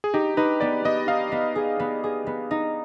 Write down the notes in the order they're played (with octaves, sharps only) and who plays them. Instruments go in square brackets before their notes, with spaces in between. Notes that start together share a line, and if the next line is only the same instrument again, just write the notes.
[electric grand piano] G#4
[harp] D#4 [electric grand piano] G4
[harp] D#4 [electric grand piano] B4
[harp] B3 [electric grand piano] D5
[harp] B3 [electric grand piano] D#5
[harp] D#4 [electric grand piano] F5
[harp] B3
G#4
B3
G#4
B3
D#4